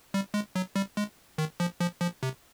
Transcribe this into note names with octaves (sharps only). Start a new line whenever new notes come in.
G3
G#3
F#3
G3
G#3
D#3
F3
F3
F3
C3